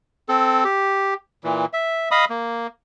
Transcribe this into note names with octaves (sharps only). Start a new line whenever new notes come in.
C4 A4
G4
A#2 E3
E5
D#5 F5 B5 D#6
A#3